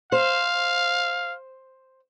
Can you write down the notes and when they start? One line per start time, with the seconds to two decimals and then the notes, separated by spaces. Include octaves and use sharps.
0.12 C5 F5